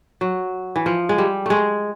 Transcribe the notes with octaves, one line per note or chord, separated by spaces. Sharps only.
F#3
E3
F3
G#3
G3
G#3 A3